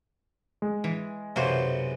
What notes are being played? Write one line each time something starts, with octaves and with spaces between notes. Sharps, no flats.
G#3
E3
B1 F#2 C3 A#3 F#4 C5